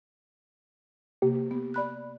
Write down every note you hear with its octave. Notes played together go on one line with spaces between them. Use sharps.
C3 A#3 G4
B3
D5 B5 F#6